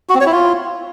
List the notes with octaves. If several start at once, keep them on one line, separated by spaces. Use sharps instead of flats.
F#4
C4
C#5
E4
F4